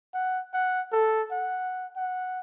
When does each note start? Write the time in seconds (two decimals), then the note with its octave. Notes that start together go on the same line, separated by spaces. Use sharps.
0.14 F#5
0.54 F#5
0.92 A4
1.31 F#5
1.96 F#5